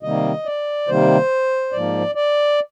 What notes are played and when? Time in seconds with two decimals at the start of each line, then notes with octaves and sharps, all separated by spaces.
0.03 C3 D#3 G3 A#3 D#5
0.45 D5
0.88 C3 D#3 G3 A#3 C5
1.72 G#2 F3 A#3 D5
2.15 D5